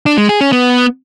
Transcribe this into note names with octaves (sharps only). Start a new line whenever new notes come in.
D4
G#3
G#4
C#4
B3